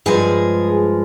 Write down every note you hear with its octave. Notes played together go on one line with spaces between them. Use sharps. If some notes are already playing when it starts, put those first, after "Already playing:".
G2 F3 G#3 G#4